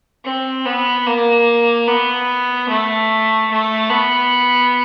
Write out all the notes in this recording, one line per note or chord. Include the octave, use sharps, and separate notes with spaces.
C4
B3
A#3
B3
A3
A3
B3